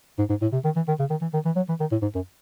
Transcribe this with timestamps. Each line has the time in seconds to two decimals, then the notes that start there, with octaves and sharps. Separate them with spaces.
0.19 G#2
0.30 G#2
0.42 A2
0.53 C3
0.64 D#3
0.76 E3
0.88 D#3
0.99 C#3
1.10 D#3
1.22 E3
1.34 D#3
1.45 E3
1.56 F#3
1.69 E3
1.80 D#3
1.91 A2
2.02 G#2
2.15 F#2